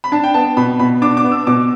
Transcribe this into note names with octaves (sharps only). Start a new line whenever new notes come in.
B5
D4 A5
G5
B3 A5
B2 B5
B2 B5
D4 D6
D6
B3
E6
B2 D6